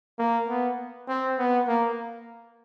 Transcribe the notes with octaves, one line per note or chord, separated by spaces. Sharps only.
A#3
B3
C4
B3
A#3